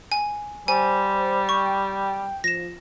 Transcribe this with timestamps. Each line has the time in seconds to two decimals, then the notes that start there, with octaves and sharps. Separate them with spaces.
0.12 G#5
0.68 G3 C5 G#5
1.49 G5 C#6
2.44 F3 A#6 E7